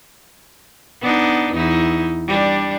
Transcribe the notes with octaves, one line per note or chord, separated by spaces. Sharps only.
B3 D4 D#4
E2 D#4 E4
G3 D4